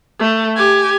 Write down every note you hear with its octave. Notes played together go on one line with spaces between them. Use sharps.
A3
G4 G#5